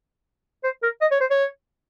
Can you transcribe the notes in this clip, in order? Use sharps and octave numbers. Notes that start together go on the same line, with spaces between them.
C5
A#4
D#5
C#5
C5
C#5